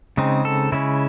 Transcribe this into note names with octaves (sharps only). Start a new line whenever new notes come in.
C#3 G#3 C4 D#4
A4
C#3 G#3 C#4 E4